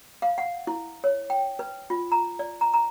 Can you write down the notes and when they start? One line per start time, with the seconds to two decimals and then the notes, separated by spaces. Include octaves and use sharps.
0.22 F5
0.38 F#5
0.67 E4
1.04 C#5
1.30 G5
1.59 B4
1.90 F4
2.12 A#5
2.39 D5
2.61 A#5
2.74 A#5